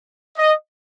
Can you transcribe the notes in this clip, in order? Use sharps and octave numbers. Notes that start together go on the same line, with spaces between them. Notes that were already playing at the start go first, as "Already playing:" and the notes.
D#5